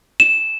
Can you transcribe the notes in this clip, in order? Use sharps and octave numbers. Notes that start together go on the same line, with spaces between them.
E7